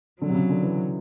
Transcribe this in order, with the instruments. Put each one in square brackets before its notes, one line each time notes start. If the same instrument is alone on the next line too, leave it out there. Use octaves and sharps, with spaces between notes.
[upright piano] D3 [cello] F#3
[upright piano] C3
C#3
D3
E3